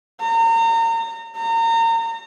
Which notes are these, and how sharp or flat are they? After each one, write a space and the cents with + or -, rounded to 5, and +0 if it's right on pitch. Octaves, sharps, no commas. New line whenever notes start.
A#5 -35
A#5 -30